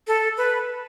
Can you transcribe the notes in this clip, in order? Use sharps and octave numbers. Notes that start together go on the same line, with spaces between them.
A4
B4